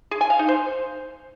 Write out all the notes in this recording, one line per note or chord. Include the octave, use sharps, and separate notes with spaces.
G#4
G#5
F5
D#4
C5